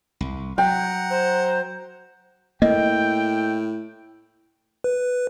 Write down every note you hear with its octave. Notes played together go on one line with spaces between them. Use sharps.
C2
F#3 F#5 G5 A#5
C5
A2 A#3 D#5 G5
B4